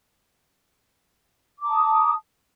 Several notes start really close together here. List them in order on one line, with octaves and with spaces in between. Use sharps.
D6 A#5 A5 D#6